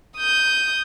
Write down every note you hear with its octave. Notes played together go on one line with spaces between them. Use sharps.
D#6 G6